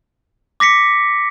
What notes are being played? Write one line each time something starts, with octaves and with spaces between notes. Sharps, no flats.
D6 A#6 B6 C#7